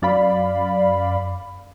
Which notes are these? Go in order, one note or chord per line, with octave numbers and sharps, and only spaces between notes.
F#2 D5 F5 B5